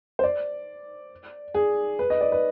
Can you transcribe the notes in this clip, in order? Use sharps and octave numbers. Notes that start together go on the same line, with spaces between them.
C5
D5
G#4
B4
D#5
D5
B4